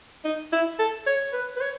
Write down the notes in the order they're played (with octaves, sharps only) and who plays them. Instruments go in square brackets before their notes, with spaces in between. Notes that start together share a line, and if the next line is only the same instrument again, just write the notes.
[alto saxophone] D#4
E4
A4
C#5
B4
B4
C#5